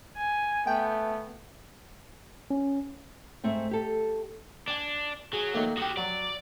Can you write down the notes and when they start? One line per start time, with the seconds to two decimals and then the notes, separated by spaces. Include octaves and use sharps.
0.17 G#5
0.67 A3 B3 G5
2.51 C#4
3.44 G#2 A3 C4 E5
3.71 G4 A4
4.68 D4 D5 G#5
5.33 F#3 G#4
5.54 D#3 A3 A#3
5.77 F#4 G4 A4 D#6
5.97 F#3 D5